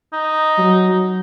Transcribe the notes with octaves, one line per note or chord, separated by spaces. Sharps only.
D#4
F#3